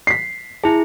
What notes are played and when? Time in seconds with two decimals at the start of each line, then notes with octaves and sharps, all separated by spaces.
0.07 B6 C7
0.64 E4 G#4 A5